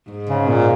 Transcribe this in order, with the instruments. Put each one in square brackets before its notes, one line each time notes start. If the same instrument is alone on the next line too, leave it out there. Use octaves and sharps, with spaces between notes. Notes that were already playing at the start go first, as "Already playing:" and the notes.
[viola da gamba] G#2
[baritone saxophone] C#3
A#2